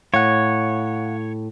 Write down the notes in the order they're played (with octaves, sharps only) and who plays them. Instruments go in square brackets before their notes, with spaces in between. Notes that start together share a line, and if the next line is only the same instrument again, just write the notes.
[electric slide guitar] A2 [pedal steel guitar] C#5 [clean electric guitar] F5 F#5